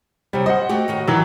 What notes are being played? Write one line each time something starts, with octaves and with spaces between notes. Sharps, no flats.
C3 F#3 G3
C5 D#5 F#5
A3 F#4 G4
A2 D#3 F#4
B2 D#3 E3 F#3